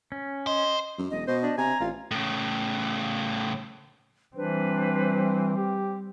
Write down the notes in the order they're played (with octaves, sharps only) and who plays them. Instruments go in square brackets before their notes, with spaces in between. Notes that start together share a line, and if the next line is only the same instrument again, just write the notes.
[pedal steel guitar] C#4
[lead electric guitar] C5 [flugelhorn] D#5
[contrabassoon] F#2
[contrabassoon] E1 [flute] D#5
[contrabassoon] B2 [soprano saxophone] C5 [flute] D#5
[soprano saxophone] D4
[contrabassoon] C3 [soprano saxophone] G#5 [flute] A#5
[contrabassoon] A1 [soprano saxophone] F4
[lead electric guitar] A2 C#3
[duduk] E3 [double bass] G3 C4 [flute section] D4 B4 C5
[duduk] G4